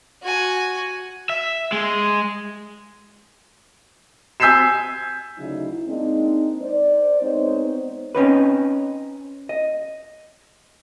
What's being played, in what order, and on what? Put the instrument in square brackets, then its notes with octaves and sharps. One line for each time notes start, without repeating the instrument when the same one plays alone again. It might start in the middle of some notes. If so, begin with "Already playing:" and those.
[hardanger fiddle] F#4 G#5
[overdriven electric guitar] E5
G#3
[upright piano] G#5 E6 G6 B6 C7 E7
[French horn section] D2 C#3 F#3 D#4 E4
G#3 A#3 C4 D4 D#4
C5 D5
G#3 B3 C4 D#4 C5 C#5
[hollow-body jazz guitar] C4 C#4 D#4 B4
D#5